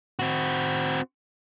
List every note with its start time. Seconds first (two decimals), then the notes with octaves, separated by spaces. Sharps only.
0.19 C4 F#4